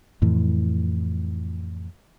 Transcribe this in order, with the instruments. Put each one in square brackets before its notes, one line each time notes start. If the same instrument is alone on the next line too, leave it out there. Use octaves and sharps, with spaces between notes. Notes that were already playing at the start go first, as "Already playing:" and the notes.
[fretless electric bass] F2 A2 E3